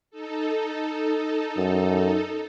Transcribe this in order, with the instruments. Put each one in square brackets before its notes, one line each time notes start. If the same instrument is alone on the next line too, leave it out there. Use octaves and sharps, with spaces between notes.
[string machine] D#4 A4
[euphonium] F#2